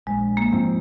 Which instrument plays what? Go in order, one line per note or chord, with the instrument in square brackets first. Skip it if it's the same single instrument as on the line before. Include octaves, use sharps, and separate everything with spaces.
[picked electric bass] A#1 [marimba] G#3
[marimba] A#3
[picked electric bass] G#2 F3 C4